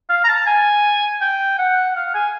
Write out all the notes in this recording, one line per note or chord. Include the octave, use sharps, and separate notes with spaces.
F5
A#5
A5
G#5
G5
F#5
F5
G#5